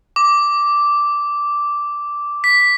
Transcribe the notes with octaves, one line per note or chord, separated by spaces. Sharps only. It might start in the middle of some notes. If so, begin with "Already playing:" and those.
D6
B6